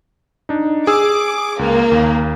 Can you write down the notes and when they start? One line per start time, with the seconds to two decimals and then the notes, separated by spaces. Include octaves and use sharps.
0.49 D4 D#4
0.87 G#4 D6 E6
1.59 C#2 A#3
1.91 D#2